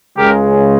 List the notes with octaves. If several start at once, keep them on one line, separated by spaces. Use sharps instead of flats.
C#2 C#3 G#3 G4 A#4